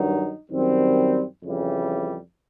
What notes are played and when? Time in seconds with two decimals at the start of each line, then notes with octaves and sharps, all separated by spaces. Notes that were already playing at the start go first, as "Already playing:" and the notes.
Already playing: G2 D#3 F#3 D#4
0.51 F#2 D#3 G3 C4
1.43 F2 C#3 E3 G3